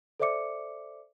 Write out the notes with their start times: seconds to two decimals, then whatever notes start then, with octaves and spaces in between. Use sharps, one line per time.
0.20 A4 C5 D5 E5 D6 C#7